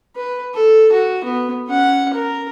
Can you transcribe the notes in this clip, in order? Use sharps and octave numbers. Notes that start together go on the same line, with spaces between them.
B4
A4
F#4
B3
C#4 F#5
A#4